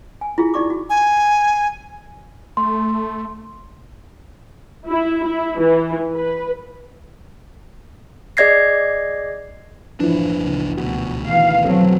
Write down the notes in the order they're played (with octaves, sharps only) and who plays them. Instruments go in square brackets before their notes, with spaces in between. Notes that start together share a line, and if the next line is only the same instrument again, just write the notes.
[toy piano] G#5
E4 F4 G#4
D#4 F#4 D5 C#6 D6
F#4
[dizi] G#5
[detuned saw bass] A3 [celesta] C6
[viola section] E4
E4
E3
B4
[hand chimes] G#4 D5 D#5 G#6 A#6 C7
[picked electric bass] F#1 D4 [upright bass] A2 [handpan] E3 F3 E4
[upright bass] C#2 A#2
[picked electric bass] D2 B2 [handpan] F#4
[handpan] D#3 E3 [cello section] F5
[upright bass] F2 [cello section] F#3 [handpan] C4 A4